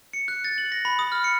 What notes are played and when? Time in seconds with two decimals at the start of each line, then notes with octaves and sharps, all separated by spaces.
0.13 C#7
0.28 F#6
0.44 A6
0.58 F#7
0.72 A#6
0.85 B5
0.99 D#6
1.12 F6
1.24 C#7